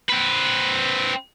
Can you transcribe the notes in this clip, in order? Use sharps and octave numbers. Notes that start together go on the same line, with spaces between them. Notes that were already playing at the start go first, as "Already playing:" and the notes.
C4 B4